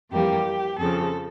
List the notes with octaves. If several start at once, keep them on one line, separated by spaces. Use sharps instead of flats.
F2 E3 G3 A#3 G4
F2 C#3 F3 A4